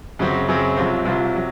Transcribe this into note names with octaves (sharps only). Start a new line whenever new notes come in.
F#2 C#3 F#3 C4
F#2 C#3 F#3 C4
C2 C3 F#3 C4 F4
C2 C3 F#3 C4 F4
C3 F#3